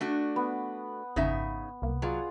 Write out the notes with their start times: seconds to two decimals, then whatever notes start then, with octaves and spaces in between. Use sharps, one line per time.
0.01 A3 D4 F#4
0.36 B3
1.16 G#1 F2 C#3 D#4 E5
1.82 C2 A#3
2.02 F#3 F4 G#4 D5